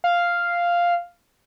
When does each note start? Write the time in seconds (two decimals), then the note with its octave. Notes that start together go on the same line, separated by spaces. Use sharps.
0.04 F5